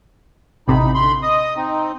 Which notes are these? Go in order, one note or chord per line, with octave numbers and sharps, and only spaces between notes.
A1 C3 D#4 B5
D2 B5 C6
D#5 D#6
C4 D#4